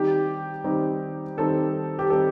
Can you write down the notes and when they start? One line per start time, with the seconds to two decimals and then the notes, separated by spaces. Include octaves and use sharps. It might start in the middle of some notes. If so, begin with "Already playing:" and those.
Already playing: D#3 G3 C4 D#4 G4
0.64 D#3 G3 C4 D#4
1.37 D#3 G3 C4 D#4 A4
1.99 G4
2.10 D#3 G3 C4 D#4 A4